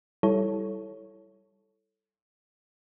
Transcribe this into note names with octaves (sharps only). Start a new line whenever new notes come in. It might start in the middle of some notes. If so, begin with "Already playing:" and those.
G3 E4 A4 C#5